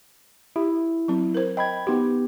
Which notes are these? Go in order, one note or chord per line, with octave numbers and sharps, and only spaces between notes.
E4 G4
F#3 C4
A#4 C5
D#5 G5 B5 G#6
B3 D#4 F#4 G4